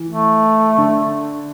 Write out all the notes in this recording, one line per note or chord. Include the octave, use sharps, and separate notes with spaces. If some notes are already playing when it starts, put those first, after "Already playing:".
Already playing: E3
A3
D3